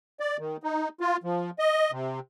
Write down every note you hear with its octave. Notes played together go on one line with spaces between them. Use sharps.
D5
D#3
D#4
F4
F3
D#5
C3